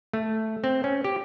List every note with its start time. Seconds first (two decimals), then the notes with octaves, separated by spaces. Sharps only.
0.13 A3
0.64 C4
0.84 C#4
1.04 G4